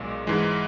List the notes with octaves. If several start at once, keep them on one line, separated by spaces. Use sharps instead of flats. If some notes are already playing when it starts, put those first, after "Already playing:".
Already playing: B1 A#2 G#3
G#2 E3 G#3